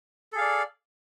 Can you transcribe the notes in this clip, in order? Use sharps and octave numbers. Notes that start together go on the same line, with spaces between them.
G#4 A4 D5 F5